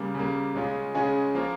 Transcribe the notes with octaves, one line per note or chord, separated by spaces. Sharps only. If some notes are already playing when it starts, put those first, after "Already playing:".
Already playing: C#3 G3 A#3
C#3 G3 A#3
C#3 G#3 C#4 F4 G#4
C#3 G#3 C#4 F4 G#4
F3 A#3 F4 A#4